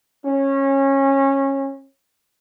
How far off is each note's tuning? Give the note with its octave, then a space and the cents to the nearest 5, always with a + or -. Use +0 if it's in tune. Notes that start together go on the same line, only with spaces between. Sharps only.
C#4 -20